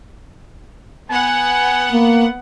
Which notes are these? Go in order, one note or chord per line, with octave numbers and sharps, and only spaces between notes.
B3 F#5 G#5
A#3